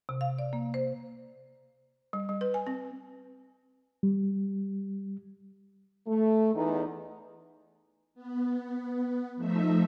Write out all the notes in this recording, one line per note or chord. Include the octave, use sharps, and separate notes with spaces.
C3
F5
D5
A#3
C5
G3
G3
B4
G#5
C4
G3
A3
E2 D#4
B3
F3 A3 D#4 E5